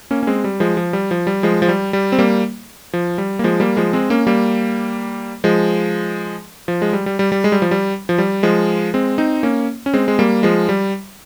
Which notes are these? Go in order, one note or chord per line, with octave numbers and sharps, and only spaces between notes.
A#3 C#4
C#4
G#3 C4
G3
F3 G#3
F3
G3
F3
G3
F3 G#3
F3
G3
G3
C4
G3 A#3
F3
G3
A#3
F3 G#3
G3 A#3
F3 G#3
G#3 C4
A#3 C#4
G3 A#3
F3 G#3
F3
G#3
G3
G3
G3
G3
G#3
G3
F3
G3
F3
G3
F3 G#3
G#3 C4
C4 D#4
A#3 C#4
C#4
G#3 C4
G#3
G3 A#3
F3 G#3
G3